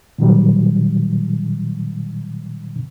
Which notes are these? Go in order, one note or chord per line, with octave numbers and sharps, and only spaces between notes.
A#2 D#3 F#3 G3